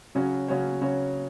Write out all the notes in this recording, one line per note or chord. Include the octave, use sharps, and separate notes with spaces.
C#3 F#3 C#4 F#4 C#5
C#3 F#3 C#4 F#4 C#5
C#3 F#3 C#4 F#4 C#5